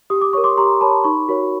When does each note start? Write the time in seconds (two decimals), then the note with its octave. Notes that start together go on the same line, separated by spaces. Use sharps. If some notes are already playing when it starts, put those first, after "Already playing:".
0.10 G4 D#6
0.22 D6
0.33 A#4 C#5 C#6
0.44 C6 D6
0.57 G4 A#5 C6
0.81 A#4 C#5 A5 B5
1.04 D#4 B5 C#6
1.29 F#4 A#4 C#5